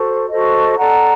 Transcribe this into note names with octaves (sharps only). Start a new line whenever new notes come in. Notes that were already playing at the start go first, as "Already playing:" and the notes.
Already playing: F#4 A4 C5
F#4 A4 C5 D#5
A4 D5 F#5 A#5